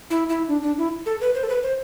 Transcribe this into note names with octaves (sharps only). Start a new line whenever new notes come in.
E4
E4
D4
D4
E4
A4
B4
C5
A4
B4
C5